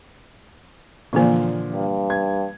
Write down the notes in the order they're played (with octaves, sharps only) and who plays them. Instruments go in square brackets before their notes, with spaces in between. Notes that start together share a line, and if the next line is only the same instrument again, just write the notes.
[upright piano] A#2 D3 F3 [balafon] E3 A#3
[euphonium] G2
[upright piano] G#6